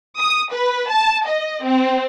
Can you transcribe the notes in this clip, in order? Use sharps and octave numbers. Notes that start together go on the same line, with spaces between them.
D#6
B4
A5
D#5
C4